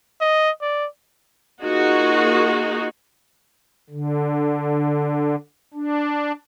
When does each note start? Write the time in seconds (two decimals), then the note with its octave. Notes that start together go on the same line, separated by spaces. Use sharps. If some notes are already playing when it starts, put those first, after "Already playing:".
0.21 D#5
0.61 D5
1.63 A#3 D#4 F4 F#4 G#4
3.90 D3
5.74 D4